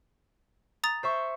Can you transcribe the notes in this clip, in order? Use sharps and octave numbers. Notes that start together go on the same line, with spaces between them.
A#5 D#6 A6
C5 E5 C#6